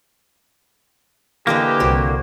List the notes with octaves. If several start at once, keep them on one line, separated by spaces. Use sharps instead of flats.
D3 E3 A#3 G4 B4 D#5
C2 F#4 C5